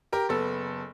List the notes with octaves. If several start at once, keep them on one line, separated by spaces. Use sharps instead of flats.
G4 A#4
F#1 B3 A4